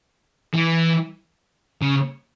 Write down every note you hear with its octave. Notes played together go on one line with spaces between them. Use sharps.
E3
C#3